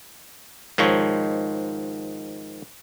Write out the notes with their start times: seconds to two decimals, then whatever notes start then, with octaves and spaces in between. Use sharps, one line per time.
0.78 G#2 D#3 F3 C#5